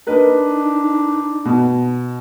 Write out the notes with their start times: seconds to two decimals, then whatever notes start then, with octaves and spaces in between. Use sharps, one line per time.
0.07 D4 D#4 A#4 B4 D#5
1.45 B2